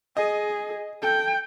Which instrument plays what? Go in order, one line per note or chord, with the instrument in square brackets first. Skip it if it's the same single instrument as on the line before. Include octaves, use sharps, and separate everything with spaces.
[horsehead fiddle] G#4 [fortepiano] D#5
[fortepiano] A4 [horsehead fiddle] G5